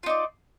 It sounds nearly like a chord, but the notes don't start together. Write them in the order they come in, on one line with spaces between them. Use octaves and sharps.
F4 D#4 D5